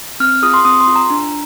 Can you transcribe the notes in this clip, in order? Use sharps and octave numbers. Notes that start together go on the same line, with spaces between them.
C4 F6
F4 G#4 D#6
C6
C4 D#6
C6
F4 G#4
A#5
D4